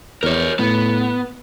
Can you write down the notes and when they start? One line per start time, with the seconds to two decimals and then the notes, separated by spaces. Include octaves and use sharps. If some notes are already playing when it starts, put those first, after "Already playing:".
0.23 E2 A#4 C#5
0.59 A2 B3